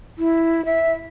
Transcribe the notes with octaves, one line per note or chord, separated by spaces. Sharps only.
E4
E5